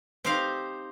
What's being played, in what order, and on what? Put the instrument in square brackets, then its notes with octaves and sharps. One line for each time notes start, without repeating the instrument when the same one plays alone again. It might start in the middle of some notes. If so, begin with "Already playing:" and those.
[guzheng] C4 D#4 G4 C5 F5